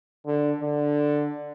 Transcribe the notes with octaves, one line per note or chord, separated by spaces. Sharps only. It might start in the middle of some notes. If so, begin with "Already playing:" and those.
D3
D3